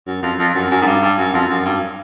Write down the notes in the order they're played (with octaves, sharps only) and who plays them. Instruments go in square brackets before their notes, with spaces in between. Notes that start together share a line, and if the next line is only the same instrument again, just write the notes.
[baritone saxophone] F#2
F2
F2
F#2
F#2
G#2
G2
G2
F#2
F2
F#2
G2